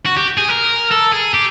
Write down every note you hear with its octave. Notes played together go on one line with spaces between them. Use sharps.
F#4
G4
G#4
A#4
A4
G#4
G4